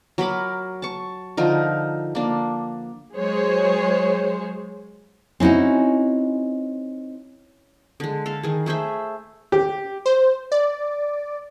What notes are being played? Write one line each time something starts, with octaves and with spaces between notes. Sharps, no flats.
F#3 A#4 B5 D6
A5 C#6
D3 F3 D#4 A#4
A#3 D4
F#3 G#3 G#4 C5 C#5
C4 C#4 D#4 E4 F#4
D3 G#3
A4 F5
D#3 G#4
A3 G#4 C5 E5
G4
C5
D5